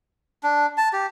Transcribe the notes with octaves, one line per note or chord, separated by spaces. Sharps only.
D4
A5
G4